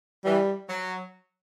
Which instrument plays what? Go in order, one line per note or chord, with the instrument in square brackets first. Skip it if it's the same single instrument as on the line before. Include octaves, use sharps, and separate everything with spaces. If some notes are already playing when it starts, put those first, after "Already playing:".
[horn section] E3 [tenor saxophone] G3
[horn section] F#3